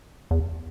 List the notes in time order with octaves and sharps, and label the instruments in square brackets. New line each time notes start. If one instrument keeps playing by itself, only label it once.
[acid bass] E2